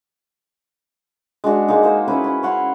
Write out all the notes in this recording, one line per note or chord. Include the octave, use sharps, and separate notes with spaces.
G#3 D4 F#4
G#3 A#3 D#4
A#3 C5
C#4 E4 B4
C#4
C#5 F#5 C6